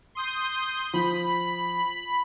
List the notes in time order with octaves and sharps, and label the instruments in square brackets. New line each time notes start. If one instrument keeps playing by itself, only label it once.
[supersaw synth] C6 D#6 G6
[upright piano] F3 [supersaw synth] B5